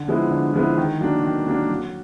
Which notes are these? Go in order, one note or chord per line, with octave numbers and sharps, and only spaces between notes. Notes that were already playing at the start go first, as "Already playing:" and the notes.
Already playing: D3
F3 G#3 B3 E4
D3
F3 G#3 B3 E4
D#3
F#3 A#3 D4
D#3
F#3 A#3 D4
F#3